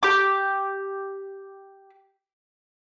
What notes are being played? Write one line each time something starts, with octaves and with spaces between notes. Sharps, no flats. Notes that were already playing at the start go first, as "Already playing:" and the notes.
G4 D6